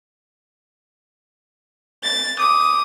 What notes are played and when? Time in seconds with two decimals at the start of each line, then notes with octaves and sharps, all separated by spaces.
2.03 A6
2.39 D6 D#6